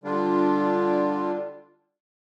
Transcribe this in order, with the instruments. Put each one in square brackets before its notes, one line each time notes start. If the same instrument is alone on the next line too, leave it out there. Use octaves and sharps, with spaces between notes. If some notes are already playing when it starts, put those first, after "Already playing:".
[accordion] D3 G3 D4 F4